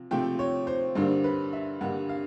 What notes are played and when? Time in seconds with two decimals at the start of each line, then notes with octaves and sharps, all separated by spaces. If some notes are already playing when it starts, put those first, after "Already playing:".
Already playing: C3 F3
0.11 C3 F3 A3 C4 G5
0.39 C#5
0.67 C5
0.95 G2 D3 G3 A#3 C5
1.24 B4
1.53 E5
1.81 G2 D3 G3 A#3 F#5
2.09 F5